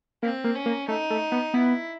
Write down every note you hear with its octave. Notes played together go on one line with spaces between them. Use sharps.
A#3 C4
A#3
C#4
A#3
A3 D#4
A3
B3
B3 E4